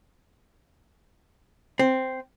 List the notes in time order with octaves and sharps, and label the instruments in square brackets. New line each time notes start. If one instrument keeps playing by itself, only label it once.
[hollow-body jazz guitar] C4